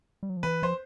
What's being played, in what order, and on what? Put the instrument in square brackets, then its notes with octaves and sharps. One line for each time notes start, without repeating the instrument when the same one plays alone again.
[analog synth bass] G3
F#3
F3
[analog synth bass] E3 [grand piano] B4
[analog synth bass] F3 [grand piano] C5